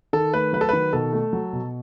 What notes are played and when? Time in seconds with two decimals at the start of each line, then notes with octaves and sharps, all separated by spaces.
0.13 D#3 A4
0.34 A3 B4
0.53 F#3 B4
0.61 A4
0.69 D#3 B4
0.93 B2 A4
1.13 A3
1.33 F#3
1.53 B2